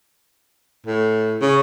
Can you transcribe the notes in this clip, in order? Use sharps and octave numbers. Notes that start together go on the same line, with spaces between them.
A2
C#3